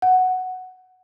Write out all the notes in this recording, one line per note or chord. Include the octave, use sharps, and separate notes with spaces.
F#5